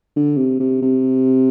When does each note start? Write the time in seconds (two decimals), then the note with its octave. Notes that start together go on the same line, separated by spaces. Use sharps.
0.16 D3
0.37 C3
0.60 C3
0.82 C3